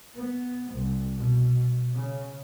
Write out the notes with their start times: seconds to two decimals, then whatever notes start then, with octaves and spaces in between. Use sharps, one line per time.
0.15 B3
0.72 C2
1.15 B2
1.94 C#3